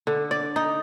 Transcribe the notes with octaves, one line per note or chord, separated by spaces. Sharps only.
D3
D5
D#4